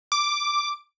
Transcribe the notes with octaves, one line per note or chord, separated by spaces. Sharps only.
D6